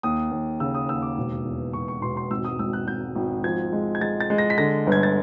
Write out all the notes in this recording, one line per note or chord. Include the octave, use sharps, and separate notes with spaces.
D#2 D#6
D#2
C#3 E6
D#6
D#2 E6
D6
E1
E2
E1 C#6
C#6
E1 C6
C6
G#1 E6
D#6
G#1 E6
F#6
G#1 G6
G#1
F3 G#6
G#3
G#6
G#3 A6
A6
G#3
A#6
B6
D3 A#6
G1
G#6
A6